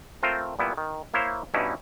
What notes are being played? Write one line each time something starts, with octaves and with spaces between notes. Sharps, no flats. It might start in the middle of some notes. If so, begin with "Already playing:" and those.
A3 C4 F4 A#4 C5
A#2 G3 B3 E4
D#3
A#3 E4 C5 C#5 E5 F5
G2 B2 C#4 D#4 E4